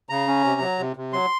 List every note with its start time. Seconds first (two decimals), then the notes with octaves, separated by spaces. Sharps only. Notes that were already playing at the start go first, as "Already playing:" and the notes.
0.09 C#3 A#5
0.27 C#4
0.44 C3
0.61 F#3
0.79 C3
0.96 C3
1.13 F#3 C6